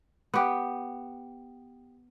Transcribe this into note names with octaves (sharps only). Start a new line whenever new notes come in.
B3 G4